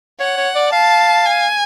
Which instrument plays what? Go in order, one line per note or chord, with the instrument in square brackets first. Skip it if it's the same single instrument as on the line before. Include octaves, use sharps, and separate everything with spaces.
[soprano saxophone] C#5 [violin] F#5
[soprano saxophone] C#5
D5
[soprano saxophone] F5 [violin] A5
[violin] G#5